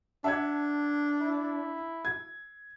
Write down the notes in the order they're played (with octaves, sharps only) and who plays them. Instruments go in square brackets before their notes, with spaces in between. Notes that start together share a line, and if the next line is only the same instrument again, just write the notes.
[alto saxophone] D4 [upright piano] E5 F#5 G#6 [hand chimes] A5
[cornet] E4
[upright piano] G#6